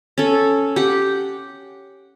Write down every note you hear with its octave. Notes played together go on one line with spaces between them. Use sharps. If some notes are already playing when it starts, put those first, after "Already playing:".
C#4 A4
G4 F#5